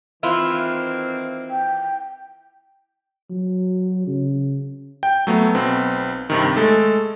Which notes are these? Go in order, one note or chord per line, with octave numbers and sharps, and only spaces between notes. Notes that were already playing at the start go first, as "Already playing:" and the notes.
D#3 E3 A#3 C4 E4 F4
G5
F#3
C#3
G5
F#3 A3 B3
B1 B3 C4
G2 C3 D#3
G#3 A3 A4